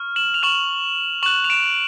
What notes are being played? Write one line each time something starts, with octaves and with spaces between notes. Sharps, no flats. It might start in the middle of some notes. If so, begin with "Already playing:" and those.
Already playing: C#6 F6
E7 F#7
F7
C#6 F6 E7 F#7
C#6 F#6 E7 F#7
F7
D7 E7